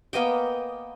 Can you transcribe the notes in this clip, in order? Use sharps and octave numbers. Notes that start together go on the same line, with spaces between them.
A#3 B3 D#5 G5